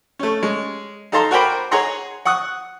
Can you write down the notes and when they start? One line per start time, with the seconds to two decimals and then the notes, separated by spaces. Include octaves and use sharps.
0.19 A3 C#4
0.43 G#3 C#4
1.12 D#4 A4 F5 A5 A#5 C6
1.31 F#4 A#4 C5 G5 B5 D6
1.71 G#4 C#5 F#5 A#5 C6
2.25 F#5 C#6 D#6 F#6